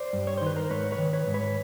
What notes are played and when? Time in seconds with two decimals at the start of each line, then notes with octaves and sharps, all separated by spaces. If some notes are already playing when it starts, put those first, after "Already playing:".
Already playing: C5 D5
0.13 G2
0.27 C#5
0.37 D#3 C5
0.47 B4
0.56 A#4 C5
0.70 G#2 B4 C#5
0.92 B4 C#5
0.98 D#3
1.13 B4 C#5
1.27 G#2
1.34 B4 C#5